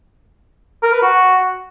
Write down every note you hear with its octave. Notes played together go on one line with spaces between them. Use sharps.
A#4
B4
F#4